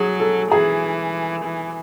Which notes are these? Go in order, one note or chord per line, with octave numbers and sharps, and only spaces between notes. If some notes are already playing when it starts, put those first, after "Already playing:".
Already playing: F#3 G#4
A4
E3 G#4
E3